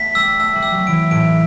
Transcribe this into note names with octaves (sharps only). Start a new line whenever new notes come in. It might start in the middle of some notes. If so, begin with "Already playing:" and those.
Already playing: A3 B3 B6
G3 E6
A3 E6
G3
E6
F#3
E3 D7
A2 D7